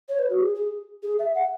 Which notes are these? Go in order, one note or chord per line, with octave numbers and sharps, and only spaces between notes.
C#5
B4
F#4
G#4
G#4
G#4
E5
F#5